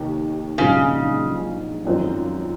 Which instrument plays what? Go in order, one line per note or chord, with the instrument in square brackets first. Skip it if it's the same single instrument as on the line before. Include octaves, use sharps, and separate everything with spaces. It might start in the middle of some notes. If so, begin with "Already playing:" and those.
Already playing: [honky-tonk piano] F1 D#2 D#3
[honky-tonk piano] A#1 G#2 F#3 C4 F4 [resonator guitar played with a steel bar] C#3
[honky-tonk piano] G#1 F#2 F3 C4